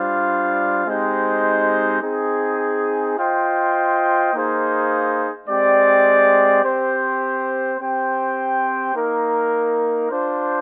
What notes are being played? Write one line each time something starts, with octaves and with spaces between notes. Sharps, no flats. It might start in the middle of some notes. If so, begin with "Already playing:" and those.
Already playing: G3 D4 F4 C5 F5
G#3 C4 D#4 G4 C5
C4 D#4 G#4
F4 C5 D#5 G5
A#3 D#4 G#4 C5 F5
G#3 C4 G4 D5
C4 G4 C5
C4 G4 C5 G5
A#3 D#4 A#4
D4 F4 C5